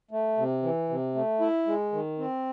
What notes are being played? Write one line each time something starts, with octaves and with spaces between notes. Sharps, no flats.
A3
C3
E3
C3
A3
E4
G#3
D#3
C4